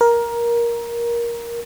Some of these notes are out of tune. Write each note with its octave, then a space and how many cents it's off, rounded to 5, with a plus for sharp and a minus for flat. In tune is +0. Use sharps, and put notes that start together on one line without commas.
A#4 +15